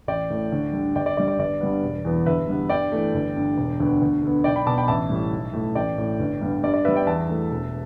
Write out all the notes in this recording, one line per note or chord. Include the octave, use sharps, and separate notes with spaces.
A1 D5 G5
A2 A3
D2
D3 G3
G1 D5 G5
D5
G2 G3 D5
D5
G1 D5
G2 G3 B3
E1
E2 E3 B3
G1 B4 E5
G2 G3 B3
G2 D5 G5
E3 A3
G1
G2 D3
E1
D2 D3 B3
D2
D3 B3
B1 D5 G5
G5 B5
B2 B3 A5 D6
G5 B5
A1 E5 A5
A2 G3
B1
A2 A3
A1 D5 G5
A2 A3
G1
G2 G3 B3
G2 D5
D5
G3 B3 B4 E5
D5 G5
E2 E5 A5
E3 A3
E1